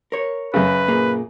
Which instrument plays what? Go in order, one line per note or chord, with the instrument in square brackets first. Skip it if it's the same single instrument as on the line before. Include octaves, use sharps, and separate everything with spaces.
[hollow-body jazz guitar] A#4 C#5
[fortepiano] F#2 C#3 [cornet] B4
[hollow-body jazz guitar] A#2 A#3 G#4